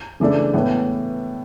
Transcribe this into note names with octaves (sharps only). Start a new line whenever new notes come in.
C#3 E3 A3 D4
A2 E3 B3